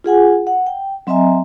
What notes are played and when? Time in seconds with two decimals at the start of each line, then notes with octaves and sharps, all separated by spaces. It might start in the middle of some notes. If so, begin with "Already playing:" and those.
0.04 F4 G#4 F#5 G#5
0.47 F#5
0.67 G5
1.07 F#3 C4 D#5 E5 G#5 A#5